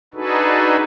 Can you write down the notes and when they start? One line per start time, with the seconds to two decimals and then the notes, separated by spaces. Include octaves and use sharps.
0.14 D4 D#4 F#4 G#4 A4 B4